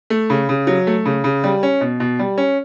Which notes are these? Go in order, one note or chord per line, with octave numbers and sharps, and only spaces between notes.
A3
C#3
C#3
F#3
A3
C#3
C#3
G3
C#4
B2
B2
G3
C#4